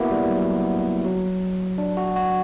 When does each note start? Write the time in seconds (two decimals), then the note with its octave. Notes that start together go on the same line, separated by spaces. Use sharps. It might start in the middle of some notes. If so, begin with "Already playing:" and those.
Already playing: A#3 B3 E4 F#4
0.11 G3
0.30 F#3
1.05 F#3
1.78 D4
1.97 F#4
2.16 F#4